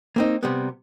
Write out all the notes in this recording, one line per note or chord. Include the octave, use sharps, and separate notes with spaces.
A#3 C4 D#4
C3 G3 B3